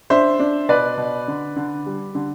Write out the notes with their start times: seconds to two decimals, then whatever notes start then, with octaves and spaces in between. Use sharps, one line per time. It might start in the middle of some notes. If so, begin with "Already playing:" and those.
0.10 D4 C5 E5
0.39 D4
0.69 B2 B4 D5
0.98 B2
1.28 D3
1.56 D3
1.86 G3
2.15 D3